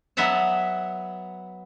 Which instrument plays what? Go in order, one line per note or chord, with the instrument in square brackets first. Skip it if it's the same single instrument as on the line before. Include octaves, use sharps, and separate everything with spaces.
[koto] F#3 B3 D#5 E5 F#5 A5